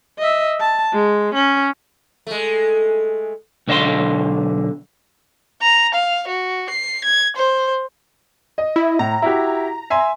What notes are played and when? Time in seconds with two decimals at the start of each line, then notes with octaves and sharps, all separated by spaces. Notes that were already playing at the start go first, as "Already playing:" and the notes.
0.19 D#5 E5
0.60 A5
0.93 G#3
1.34 C#4
2.27 G#3 A3
3.68 B1 D3 D#5 F5 C6
5.62 A#5
5.94 F5
6.28 F#4
6.70 C7
7.04 G#6
7.36 C5
8.58 D#5
8.76 E4
8.99 A2 A#5
9.22 E4 F#4 G4
9.90 E5 G#5 C6